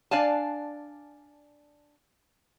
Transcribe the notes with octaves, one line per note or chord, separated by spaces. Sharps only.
D4 D5 F5 G#5 A5